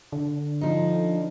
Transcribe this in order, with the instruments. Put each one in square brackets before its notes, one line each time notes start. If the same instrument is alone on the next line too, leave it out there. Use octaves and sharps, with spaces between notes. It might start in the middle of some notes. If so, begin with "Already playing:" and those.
[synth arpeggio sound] D3
[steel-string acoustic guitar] F3 D#4